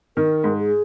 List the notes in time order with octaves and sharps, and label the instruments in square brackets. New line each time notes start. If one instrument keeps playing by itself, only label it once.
[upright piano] D#3 [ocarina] A#4
[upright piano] G#2
[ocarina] G#4